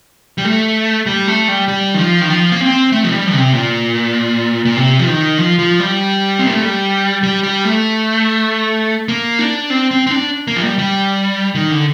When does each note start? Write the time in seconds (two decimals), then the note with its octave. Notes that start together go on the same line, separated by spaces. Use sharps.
0.38 G3
0.45 A3
1.06 G3
1.27 A3
1.48 G3
1.68 G3
1.94 D#3
1.98 F3
2.21 D#3
2.30 F3
2.52 A#3
2.61 C4
2.92 A3
3.04 F3
3.12 G3
3.33 C3
3.54 A#2
4.65 A#2
4.77 C3
4.99 F3
5.07 D#3
5.38 F3
5.59 F3
5.80 G3
6.39 C4
6.47 A#3
6.54 A3
6.62 G3
7.23 G3
7.43 G3
7.65 A3
9.08 A#3
9.39 D4
9.70 C4
9.91 C4
10.07 C4
10.11 D4
10.47 A#3
10.56 F3
10.62 G3
10.79 G3
11.55 D#3
11.71 D3